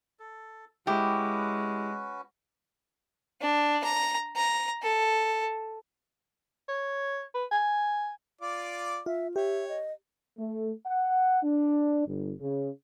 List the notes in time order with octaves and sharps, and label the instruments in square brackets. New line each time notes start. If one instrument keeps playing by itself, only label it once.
[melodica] A4
[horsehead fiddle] G#3 [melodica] C#4 F#4 B4 [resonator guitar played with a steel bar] E4 G4
[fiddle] D4
A#5
A#5
A4
[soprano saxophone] C#5
B4
G#5
[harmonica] F4 D5 D6
[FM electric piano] F4 [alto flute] E5
[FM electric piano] G4 [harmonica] C#5 [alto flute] E5
[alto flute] D#5
[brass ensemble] A3
F#5
D4
G1
C#3